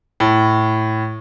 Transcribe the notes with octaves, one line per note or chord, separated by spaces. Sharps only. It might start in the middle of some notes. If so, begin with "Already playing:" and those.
A2